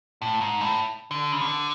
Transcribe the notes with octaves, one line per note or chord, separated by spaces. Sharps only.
A2
G#2
A2
D3
C#3
D3